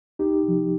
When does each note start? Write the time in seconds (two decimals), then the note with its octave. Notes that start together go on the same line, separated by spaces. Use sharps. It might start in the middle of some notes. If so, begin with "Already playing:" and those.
0.19 C2 D#4 G4
0.43 C3 F3